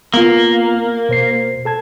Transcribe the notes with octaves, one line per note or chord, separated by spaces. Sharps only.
A#3 B3 F4
B2 C5 C7
A4 A5 G#6